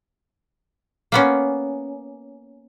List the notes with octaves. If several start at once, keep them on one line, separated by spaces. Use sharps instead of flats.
A#3 B3 C#4